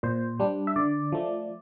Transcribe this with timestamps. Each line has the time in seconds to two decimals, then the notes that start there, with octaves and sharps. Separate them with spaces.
0.03 A#2 C5
0.40 G3 D4
0.67 E5
0.76 D3 D5
1.12 F3 A3